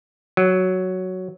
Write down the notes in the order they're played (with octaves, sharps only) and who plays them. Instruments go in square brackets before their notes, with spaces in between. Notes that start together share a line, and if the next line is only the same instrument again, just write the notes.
[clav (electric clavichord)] F#3